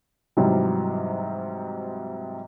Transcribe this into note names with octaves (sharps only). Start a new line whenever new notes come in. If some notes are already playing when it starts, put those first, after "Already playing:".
G#2 C3 E3 F#3 G3